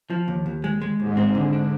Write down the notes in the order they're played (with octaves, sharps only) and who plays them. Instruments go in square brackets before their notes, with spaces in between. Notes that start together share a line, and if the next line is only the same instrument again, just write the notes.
[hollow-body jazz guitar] F3
D#2
D#2
G#3
G#3
[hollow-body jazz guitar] D#2 [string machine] G#2
[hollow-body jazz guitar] C4
D3
D4